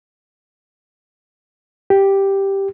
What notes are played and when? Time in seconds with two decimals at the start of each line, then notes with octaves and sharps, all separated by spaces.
1.90 G4